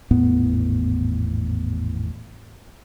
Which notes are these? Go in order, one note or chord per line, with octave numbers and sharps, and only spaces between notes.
G#1 E2 A2 B3